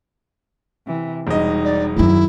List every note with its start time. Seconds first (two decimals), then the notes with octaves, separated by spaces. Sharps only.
0.86 C3 E3
1.27 E1 G3 D#4 D#5
1.64 D5
1.96 F#2 D#3 E4